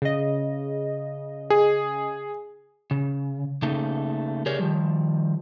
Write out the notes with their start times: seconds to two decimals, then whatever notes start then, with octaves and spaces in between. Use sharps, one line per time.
0.02 C#3 D#5
1.50 G#4
2.91 C#3
3.62 C#3 A3 A#3 D#4
4.46 G4 G#4 A#4 C#5 D5
4.59 D#3 F3 G3